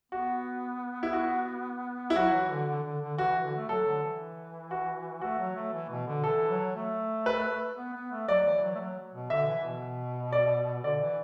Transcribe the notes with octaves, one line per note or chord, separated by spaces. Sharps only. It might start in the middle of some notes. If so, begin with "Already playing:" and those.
B3 F#4
E4
F#4
E4
F#3 F#4
E3
D3
D3
D3
D3
E3 F#4
E3
D3
A3
F#3 A4
D3
E3
F#4
A3 F#4
F#3
A3
E3
B2
D3
E3 A4
F#3
A3
B4
B3
B3
A3
F#3 D5
E3
F#3
A3
F#3
B2
D3 E5
E3
B2
D5
D3 D5
E3